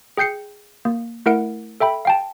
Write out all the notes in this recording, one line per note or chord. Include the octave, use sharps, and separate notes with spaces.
G#4 G5 G6 C7 C#7
A#3
A3 E4 A#4 F#5 D7
A4 E5 G5 B5
F5 G5 A5